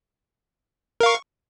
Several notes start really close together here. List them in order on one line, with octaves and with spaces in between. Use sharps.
A#4 F5 C#6